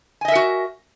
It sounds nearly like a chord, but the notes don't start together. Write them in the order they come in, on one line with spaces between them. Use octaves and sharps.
G#5 D#5 E5 A#4 F#4